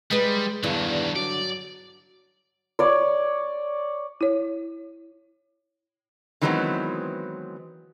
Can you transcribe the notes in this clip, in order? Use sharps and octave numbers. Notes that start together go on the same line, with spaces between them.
G3 G#3 B4
E2 G2 D3 D#3 F#3
F#3 D5
C#5 D5
E4 C#5
D#3 E3 F#3 G#3 B3 C4